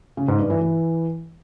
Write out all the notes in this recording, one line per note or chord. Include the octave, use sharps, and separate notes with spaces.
C#3
G#2
G2
E3
E3